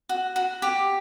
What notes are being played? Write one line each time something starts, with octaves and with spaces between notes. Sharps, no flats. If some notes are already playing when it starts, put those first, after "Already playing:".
F#4
F#4
G4